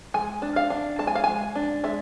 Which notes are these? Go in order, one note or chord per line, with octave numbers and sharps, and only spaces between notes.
G#3 G#5
D4
F5
D4
G#3 A5
G#5
F5
G#3 G#5
D4
G#3 E5